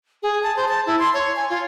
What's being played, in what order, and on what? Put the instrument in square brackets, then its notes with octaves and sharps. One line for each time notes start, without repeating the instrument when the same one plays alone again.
[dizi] G#4
A5
C5
A5
E4
C6
C#5
G#5
F4